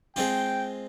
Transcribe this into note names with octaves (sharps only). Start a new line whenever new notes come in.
G#3 C4 F4 G5